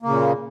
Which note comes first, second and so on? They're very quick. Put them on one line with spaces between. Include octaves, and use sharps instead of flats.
A#3 C#3 A#2